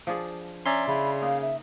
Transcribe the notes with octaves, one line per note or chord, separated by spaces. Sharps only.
F3 D4 G#4
C#4 D5 E5 A#5 C6
C#3 E4 B5
A#3 D#4 F5
E5